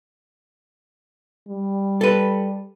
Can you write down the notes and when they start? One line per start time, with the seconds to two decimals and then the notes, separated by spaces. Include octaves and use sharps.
1.48 G3
2.01 A4 B4